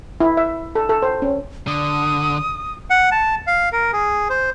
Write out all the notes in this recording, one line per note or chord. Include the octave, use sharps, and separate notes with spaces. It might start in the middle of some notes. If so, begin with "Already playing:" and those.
E4
E5
A4
A4
C5
C#4
D3 D#6
F#5
A5
F5
A#4
G#4
C5